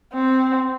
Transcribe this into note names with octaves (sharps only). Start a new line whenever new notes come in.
C4